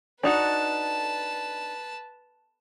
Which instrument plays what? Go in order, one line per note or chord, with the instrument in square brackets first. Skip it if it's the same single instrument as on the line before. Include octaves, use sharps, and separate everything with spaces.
[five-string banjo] D4 D#4 F#4 [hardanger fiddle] B4 A5